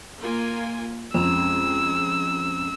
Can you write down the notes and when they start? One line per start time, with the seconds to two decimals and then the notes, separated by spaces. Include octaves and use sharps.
0.18 A#3 F4 G#5
1.14 F2 G#3 C4 C#4 A#5 E6